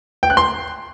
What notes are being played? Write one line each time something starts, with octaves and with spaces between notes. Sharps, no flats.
G5
F#6
C6